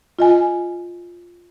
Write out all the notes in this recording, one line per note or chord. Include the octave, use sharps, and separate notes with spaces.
F4 D#5 G#5